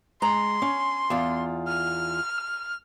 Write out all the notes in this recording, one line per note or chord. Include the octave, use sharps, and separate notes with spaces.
G#3 A#5 C6
C#4
E2 F4
F6